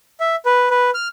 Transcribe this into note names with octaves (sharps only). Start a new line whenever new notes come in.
E5
B4
B4
F6